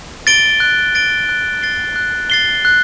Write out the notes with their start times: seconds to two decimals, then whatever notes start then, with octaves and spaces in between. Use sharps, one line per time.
0.27 A6 D7 G7
0.60 F#6
0.95 A6 D7 G7
1.29 F#6
1.63 A6 C7 G7
1.96 F#6
2.30 A6 C7 G7
2.65 F#6